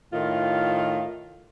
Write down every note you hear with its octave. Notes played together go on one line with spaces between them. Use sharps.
A2 D#3 F4